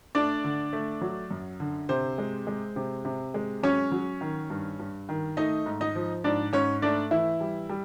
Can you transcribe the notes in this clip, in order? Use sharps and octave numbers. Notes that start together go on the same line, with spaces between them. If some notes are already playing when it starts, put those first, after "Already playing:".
A3 D4 D5
D3
A3
F#3
F#2
D3
C3 C5
G#3
G#3
C3
C3
G#3
F#3 C#4 C#5
F#3
D#3
G2
G2
D#3
A3 D#4 D#5
G#2
D#4 D#5
F3
G#2 D4 D5
G#2 C#4 C#5
A3 D4 D5
E3 E4 E5
G3
G3